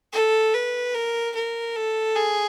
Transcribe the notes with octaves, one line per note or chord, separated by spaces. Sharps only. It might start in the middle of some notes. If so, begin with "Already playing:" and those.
A4
B4
A#4
A#4
A4
G#4